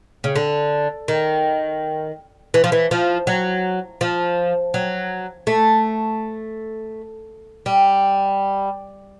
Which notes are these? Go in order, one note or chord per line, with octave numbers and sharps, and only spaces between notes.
C#3
D3
D#3
E3
F3
E3
F3
F#3
F3
F#3
A3
G3